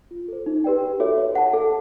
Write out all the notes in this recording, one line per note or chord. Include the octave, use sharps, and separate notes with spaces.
F4
A4 C5
D#4
G4 B4 D5 G5
D#4
F#4 A4 C#5 E5
C#5
F#5 A5
A4